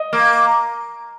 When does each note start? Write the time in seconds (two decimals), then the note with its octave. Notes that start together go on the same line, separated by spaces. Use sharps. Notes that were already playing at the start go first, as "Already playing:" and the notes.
Already playing: D#5
0.13 A#3